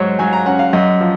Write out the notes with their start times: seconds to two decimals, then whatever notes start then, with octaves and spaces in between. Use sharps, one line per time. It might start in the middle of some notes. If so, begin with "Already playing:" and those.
Already playing: G#2 F#3 C5 C#5
0.19 F#3 G#5
0.33 A#5
0.46 C#4 F#5
0.59 F5
0.73 F#2 D#5
1.01 F3